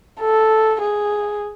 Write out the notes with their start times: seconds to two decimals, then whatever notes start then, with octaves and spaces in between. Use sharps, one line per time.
0.20 A4
0.82 G#4